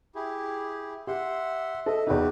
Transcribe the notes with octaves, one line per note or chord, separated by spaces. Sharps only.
E4 G4 G#4
G4 E5 F#5 C6
A4 D#5 E5
E2 D#4 F#4 G4 B4